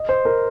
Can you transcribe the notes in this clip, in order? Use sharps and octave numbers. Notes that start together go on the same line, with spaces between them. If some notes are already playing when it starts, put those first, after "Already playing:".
Already playing: D#5
C5
A#4